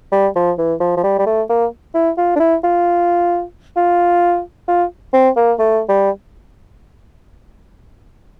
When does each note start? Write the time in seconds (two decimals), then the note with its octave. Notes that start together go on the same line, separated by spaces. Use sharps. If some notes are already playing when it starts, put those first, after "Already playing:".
0.12 G3
0.35 F3
0.58 E3
0.80 F3
0.97 F3
1.04 G3
1.19 G3
1.26 A3
1.49 A#3
1.94 E4
2.18 F4
2.36 D4
2.39 E4
2.63 F4
3.76 F4
4.68 F4
5.13 C4
5.36 A#3
5.59 A3
5.89 G3